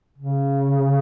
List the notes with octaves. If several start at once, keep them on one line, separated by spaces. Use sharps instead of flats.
C#3